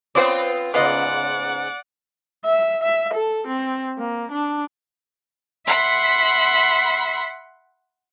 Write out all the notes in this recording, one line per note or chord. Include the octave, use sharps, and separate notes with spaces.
B3 C4 F4 C5 D5
G#2 C#3 B3 F4 D5 D#5 F#5
E5
E5
A4
C4
A#3
D4
E5 F#5 B5 C6